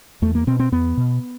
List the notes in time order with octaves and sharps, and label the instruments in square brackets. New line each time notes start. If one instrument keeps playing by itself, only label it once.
[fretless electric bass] E2 A3
A#3
B2 C4
C4
E2 B3
B2